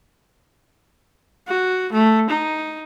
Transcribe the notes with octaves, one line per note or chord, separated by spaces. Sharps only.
F#4
A3
D#4